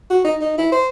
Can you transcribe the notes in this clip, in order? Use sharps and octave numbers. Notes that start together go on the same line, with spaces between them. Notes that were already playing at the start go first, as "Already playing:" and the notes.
F#4
D#4
D#4
E4
C5